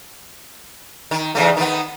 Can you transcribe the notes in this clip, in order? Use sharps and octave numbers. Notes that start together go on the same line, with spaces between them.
D#3
E2 C#3 A3
D#3 B3